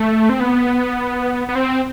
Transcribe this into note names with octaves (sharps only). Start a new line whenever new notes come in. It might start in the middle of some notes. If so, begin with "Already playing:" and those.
Already playing: A3
C4
B3
B3
C4